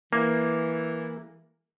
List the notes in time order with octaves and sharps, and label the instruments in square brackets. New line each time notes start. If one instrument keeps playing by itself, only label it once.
[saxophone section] E3 [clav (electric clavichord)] A#3